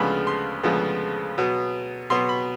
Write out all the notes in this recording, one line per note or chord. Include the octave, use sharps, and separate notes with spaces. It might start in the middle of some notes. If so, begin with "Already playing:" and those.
Already playing: D2 C#3 F3 G#3 B3 B5
C6
D2 C#3 F3 G#3 B3
B2 F#3 B3
B2 F#3 B3 C6
B5